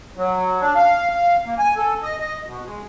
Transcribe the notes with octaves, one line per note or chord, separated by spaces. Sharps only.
F#3
D4
F5
F5
A#3
G#5
A4
D#5
D#5
B2
G#3